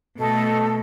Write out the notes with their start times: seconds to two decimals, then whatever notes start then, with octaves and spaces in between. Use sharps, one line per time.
0.17 B2 A3 A4 D#5